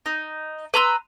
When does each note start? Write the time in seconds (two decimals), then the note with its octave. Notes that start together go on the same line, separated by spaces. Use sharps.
0.06 D#4
0.74 B4 A#5 C6 E6